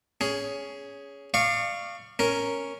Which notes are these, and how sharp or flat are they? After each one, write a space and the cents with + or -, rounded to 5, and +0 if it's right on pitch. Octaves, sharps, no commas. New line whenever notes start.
C#4 +15 G#4 +0
D5 +35 F5 -10 C#6 +0
C#4 +0 A#4 +0